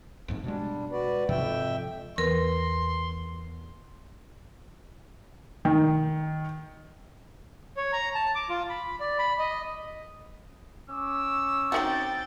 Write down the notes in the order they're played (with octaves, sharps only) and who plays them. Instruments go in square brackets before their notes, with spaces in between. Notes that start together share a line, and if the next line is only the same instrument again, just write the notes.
[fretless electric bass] A1 F2 G#2
[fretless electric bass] B2 G#3 [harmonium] G3 D4
[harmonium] F#4 B4 D5
[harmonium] F2 E5 G5 [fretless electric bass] G#2 C3 F3
[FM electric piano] E2 [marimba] A#4 B4 [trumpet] C6
[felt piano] D#3
[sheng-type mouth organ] C#5
A#5
A5
D6
F4
B5
D5
B5
D#5
[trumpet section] C#4 C#6 D6 [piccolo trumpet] E6
[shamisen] C4 D#4 F#4 [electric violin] G5 A6